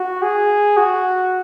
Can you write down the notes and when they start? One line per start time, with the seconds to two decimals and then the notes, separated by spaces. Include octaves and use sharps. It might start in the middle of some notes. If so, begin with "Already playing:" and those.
Already playing: F#4
0.22 G#4
0.77 F#4